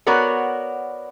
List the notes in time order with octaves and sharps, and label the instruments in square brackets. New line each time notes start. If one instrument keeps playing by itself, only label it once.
[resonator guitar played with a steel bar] B3 F#4 A#4 C#5 D5